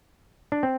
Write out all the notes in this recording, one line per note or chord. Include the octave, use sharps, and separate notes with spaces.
D4
C4